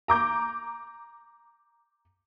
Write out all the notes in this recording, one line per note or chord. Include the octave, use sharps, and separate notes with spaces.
A#5 D6 G6